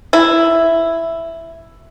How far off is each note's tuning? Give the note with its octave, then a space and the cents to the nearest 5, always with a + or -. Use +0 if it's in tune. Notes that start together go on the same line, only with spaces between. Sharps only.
E4 +5